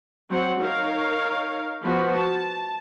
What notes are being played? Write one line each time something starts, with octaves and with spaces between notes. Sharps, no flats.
F#3 C4 C5 F#5
D#4 A#4 C#5 F5
F3 B3 F#4
A5